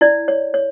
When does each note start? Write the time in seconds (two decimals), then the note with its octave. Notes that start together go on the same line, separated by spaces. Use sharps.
0.01 E4 D5
0.28 C#5
0.54 C#5